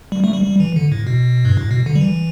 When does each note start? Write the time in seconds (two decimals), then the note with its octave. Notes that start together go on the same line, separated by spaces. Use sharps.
0.12 G3
0.24 A3
0.33 G3
0.44 G3
0.60 E3
0.76 D3
0.92 A2
1.07 B2
1.45 G2
1.57 A2
1.71 B2
1.86 D3
1.95 G3
2.01 E3